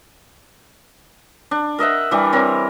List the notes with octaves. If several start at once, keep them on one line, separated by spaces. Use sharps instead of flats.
D4
A#4 D#5 E5 F#5
E3 G3 D4
C4 A#4 C#5